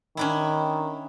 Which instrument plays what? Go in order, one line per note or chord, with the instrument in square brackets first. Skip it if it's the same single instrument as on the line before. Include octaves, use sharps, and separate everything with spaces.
[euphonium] D#3 [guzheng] C#4 D4 E4